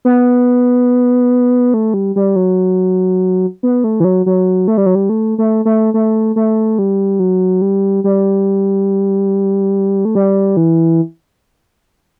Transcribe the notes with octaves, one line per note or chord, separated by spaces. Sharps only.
B3
A3
G3
G3
F#3
B3
A3
E3
F#3
F#3
A3
G3
F#3
G3
A3
A3
A3
A3
A3
G3
F#3
G3
G3
A3
G3
E3